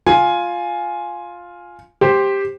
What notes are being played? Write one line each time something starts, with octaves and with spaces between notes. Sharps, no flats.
F4 G#5
G4 C5